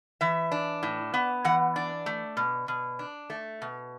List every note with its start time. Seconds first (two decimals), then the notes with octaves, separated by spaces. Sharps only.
0.21 E3 E5
0.52 D4
0.83 A2
1.14 B3
1.45 E3 F#5
1.76 D4 D5
2.06 A3
2.37 B2
2.68 B2
2.99 D4
3.30 A3
3.62 B2